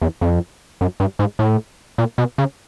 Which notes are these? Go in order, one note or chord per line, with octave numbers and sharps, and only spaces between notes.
E2
F2
F#2
G2
G#2
A2
A#2
B2
C#3